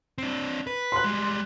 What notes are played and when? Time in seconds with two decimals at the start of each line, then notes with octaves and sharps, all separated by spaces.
0.18 C4 D4
0.67 B4
0.92 C6 F#6
1.04 G3 G#3